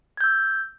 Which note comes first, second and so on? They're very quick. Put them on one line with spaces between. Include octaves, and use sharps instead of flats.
G#6 G6 E6